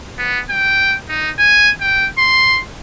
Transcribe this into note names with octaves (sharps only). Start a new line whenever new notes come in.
B3
G5
D#4
G#5
G5
C6